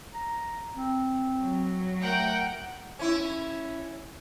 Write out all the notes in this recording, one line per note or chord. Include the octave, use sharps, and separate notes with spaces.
A#5
C4
F#3
A3 A#4 F#5 G5
C#4 E4